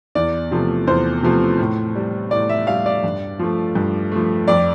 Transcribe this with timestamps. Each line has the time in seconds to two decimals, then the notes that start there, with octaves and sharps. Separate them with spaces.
0.15 E2 D5
0.51 C3 F3 A3
0.87 E2 C5
1.23 C3 F3 A3
1.59 A2
1.95 G3
2.31 A2 D5
2.49 E5
2.67 G3 F5
2.86 D5
3.04 G2
3.39 F3 A3
3.75 G2
4.12 F3 A3
4.48 F2 D5